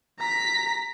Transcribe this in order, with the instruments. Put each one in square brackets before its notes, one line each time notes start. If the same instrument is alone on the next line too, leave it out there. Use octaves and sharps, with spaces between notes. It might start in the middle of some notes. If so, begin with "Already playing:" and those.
[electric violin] A#5 B6